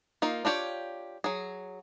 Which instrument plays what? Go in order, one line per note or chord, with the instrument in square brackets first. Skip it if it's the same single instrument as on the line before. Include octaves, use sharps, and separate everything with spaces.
[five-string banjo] A#3 D#4 F4
D4 F4 G4 C#5
F#3 G#4